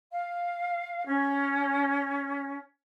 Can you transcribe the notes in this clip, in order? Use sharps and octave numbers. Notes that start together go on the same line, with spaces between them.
F5
C#4